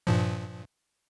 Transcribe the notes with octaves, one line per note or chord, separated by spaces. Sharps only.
G2 A#2 F3